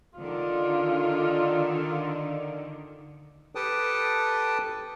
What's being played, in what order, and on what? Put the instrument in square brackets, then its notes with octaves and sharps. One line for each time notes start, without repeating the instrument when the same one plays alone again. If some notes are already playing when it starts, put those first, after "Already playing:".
[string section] D3 D#3 [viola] F4
[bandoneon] G4 A4 B4 G5 A5 D#6